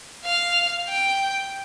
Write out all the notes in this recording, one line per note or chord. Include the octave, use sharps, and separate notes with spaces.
F5
G5